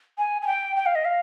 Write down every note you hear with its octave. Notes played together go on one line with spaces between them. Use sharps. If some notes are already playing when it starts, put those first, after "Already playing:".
G#5
G#5
G5
G5
F5
D#5
F5